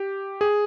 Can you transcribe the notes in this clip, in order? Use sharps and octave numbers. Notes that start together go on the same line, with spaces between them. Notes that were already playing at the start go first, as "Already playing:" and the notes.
Already playing: G4
G#4